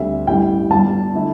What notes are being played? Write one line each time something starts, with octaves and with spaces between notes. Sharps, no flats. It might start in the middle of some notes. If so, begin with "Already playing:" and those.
Already playing: D2 D3 G3 C4 E5
A1 G2 G3 E4 G5
G1 G2 G3 A5
D3 A3 E4